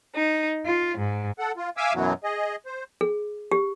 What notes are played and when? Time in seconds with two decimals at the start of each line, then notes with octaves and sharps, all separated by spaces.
0.15 D#4
0.65 F4
0.97 G#2
1.39 A4 F#5
1.57 F4
1.77 E5 F5 G#5 D6 E6
1.94 F#2 B2 E3 F#3
2.24 G#4 D#5
2.66 C5
3.01 G#4
3.52 G4